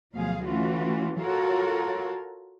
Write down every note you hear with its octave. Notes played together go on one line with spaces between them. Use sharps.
D2 B2 F3 F#3 G#4 F5
E3 A3 C#4 F4 F#4
F4 F#4 A4 A#4 C#5